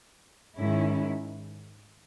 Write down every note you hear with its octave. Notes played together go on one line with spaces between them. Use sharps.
G#2 D#3 G#3 C#4 E4